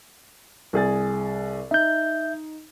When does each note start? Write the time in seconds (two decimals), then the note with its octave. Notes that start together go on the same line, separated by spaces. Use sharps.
0.73 C2 G#4 A6
1.71 D#4 E5 G6